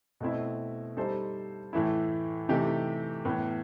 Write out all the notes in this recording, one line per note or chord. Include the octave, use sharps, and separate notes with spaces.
B2 A3 C4 E4
G3 D#4 A4 C5
A2 E3 A3 E4
C3 E3 A3 D#4 G4
A2 E3 B3